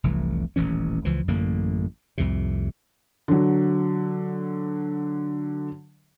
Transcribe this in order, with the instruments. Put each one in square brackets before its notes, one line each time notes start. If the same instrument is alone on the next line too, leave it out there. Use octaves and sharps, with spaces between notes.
[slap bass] F1 C2 E3 A3
D#1 A1 E3 C#4
C#2 E3 F3
A1 F#2 D3 A#3
C2 F2 A2 C3
[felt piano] D3 F#3